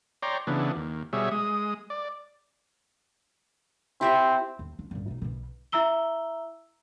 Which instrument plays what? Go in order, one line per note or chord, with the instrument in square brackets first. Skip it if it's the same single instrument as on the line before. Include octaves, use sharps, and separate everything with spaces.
[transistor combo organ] C#5 D5 G5 A#5 C6
C#3 E3 B3 D4
D#2
B2 G3 G#4 C#5 E5
G#3 D#6
D5
[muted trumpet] C4 [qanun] E4 G4 E5
[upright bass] D#2
D4
A1 G2
B1 D#4
B1 B2
[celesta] E4 E5 A#5 E6 G7